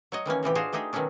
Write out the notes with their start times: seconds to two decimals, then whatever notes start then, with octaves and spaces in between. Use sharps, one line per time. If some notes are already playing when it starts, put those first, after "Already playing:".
0.12 F#3 C#5 D#5
0.26 D#3 E3 A#3 C#4
0.43 A2 C3 E3 G4
0.55 D4 F4 F#4 G#4 C5 F5
0.73 A3 D4 D#4 G4 G#4
0.93 B2 D#3 F#3 A3 C#4 D4